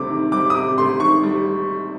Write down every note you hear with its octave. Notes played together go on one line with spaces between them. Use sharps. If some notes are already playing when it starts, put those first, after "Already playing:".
Already playing: D2 C3 G3 D6
D#3
G3 D6
D#6
C3 D6
D2 C6
D#3 C#6
G3